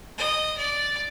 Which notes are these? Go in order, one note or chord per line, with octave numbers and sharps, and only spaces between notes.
D#5
D5